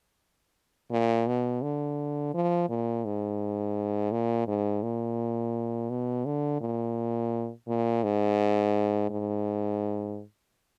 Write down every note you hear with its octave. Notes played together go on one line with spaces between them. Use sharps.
A#2
B2
D3
F3
A#2
G#2
A#2
G#2
A#2
B2
D3
A#2
A#2
G#2
G#2